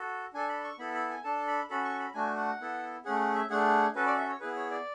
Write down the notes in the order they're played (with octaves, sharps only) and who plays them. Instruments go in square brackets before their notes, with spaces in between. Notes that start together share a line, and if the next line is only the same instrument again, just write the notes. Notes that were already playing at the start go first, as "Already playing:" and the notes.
Already playing: [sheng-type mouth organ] F#4 A4
D4 A4 G#5
B5
C#6
B3 E4 A4 B5
B5
G#5
D4 A4 A5
B5
C#4 F#4 A4 B5
C#6
B5
A3 D4 F#4 G#5
F#5
B3 E4 A4
A3 C#4 G#4 F#5
F#5
E5
A3 D4 G#4 F#5
C#4 F#4 A4 B4
D5
E5
C#5
B3 E4 G#4 B4
C#5
D5